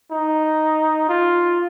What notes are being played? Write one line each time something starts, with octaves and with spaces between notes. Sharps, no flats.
D#4
F4